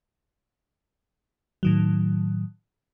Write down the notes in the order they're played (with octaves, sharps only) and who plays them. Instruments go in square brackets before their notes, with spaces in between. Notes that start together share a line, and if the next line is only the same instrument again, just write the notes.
[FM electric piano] A2 D#3 F#3